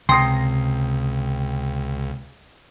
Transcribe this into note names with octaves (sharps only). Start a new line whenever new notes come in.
C#2 C3 G5 C6 D#6 A#6 C7